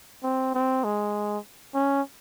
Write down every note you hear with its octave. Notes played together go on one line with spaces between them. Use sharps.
C4
C4
G#3
C#4